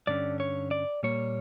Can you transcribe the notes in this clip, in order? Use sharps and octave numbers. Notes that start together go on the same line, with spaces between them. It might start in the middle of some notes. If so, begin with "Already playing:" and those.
G2 D3 G3 C#4 D5
C#5
D5
A#2 G3 A#3 C#5